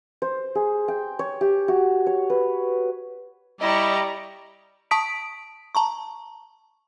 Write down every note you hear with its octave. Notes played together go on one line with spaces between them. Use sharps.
C5
G#4
G5
C#5
G4
F#4
C#5
B4
G3 E4 G4 D5 D#5 A#5 C#6
A5 C#6 D#6 B6 D7
A5 A#5 C#6